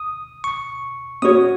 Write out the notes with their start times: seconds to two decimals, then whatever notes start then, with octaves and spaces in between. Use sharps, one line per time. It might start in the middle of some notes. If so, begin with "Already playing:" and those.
Already playing: D#6
0.44 C#6
1.22 C#4 F#4 C#5 D#6